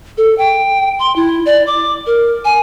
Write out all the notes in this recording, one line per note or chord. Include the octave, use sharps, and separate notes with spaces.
A4
G5
C6
E4
D5
D6
A#4
G#5